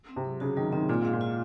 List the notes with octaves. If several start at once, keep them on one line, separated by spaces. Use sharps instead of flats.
C4
C3
F#3
C#3 F#4
D#3 F#3
D#3 C4
A#2 F4
G#2 F5
A#2
F4